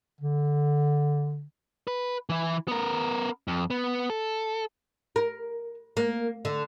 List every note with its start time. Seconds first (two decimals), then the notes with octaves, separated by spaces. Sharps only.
0.21 D3
1.87 B4
2.29 E3 E4
2.68 B3 A#4
3.48 F2
3.70 B3
4.10 A4
5.16 A#4
5.97 A#3
6.45 D3